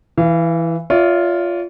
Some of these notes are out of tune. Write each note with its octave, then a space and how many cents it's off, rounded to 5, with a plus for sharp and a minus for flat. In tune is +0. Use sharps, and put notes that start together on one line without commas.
E3 +0 F5 -40
F4 +0 C#5 +45 E5 -20